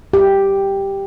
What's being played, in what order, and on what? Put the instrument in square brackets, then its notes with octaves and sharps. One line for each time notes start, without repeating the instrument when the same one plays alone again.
[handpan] G4